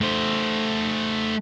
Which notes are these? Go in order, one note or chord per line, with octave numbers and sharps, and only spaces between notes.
A3 C5